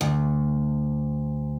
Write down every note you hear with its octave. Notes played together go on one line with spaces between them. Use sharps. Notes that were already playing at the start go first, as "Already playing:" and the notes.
D2